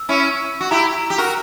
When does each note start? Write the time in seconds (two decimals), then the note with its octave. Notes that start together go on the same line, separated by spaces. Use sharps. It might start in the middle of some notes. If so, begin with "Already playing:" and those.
Already playing: E6
0.09 C#4 E4
0.60 F#4
0.71 E4 G4 A#5
1.10 G4
1.18 F#4 A#4